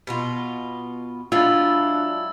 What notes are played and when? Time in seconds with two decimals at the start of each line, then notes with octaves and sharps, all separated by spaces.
0.07 B2 B3 F4
1.32 F#3 G#3 D4 E4 F4 E6 A6